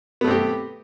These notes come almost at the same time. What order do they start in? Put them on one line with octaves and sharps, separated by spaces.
B3 A3 C4 G4